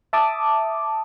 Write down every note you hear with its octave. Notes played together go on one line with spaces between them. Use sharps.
E5 A5 D6 D#6